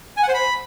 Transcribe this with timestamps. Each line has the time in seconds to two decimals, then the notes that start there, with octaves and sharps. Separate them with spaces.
0.17 G#5
0.23 F#5
0.28 C5
0.34 B5